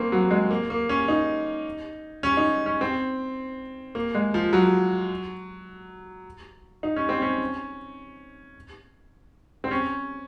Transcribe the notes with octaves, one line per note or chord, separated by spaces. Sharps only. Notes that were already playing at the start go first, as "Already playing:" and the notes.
Already playing: A#3 C4 C#4
F#3
G#3
A#3
A#3
C#4
D#4
C#4
D#4
C#4
C4
A#3
G#3
F3
F#3
D#4
C#4
C4
C#4
C4
C#4